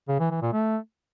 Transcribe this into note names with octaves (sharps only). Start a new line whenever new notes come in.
C#3
E3
E3
A#2
A3